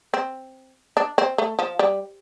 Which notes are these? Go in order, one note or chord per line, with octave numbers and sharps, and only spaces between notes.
C4
D4
C4
A3
F3
G3